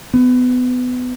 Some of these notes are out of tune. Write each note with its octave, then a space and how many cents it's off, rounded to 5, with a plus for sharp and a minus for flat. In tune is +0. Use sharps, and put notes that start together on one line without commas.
B3 +20